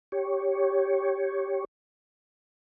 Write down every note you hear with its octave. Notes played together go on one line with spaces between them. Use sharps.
G4 C#5